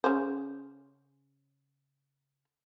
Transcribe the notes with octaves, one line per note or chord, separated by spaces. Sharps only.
C#3 C#4 C5